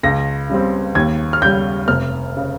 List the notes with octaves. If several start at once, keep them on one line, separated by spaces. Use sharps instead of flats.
C#2 A#6
C#3 G3 C4
D#2 G#6
F6
C#3 G3 G6
F1 F6
C#3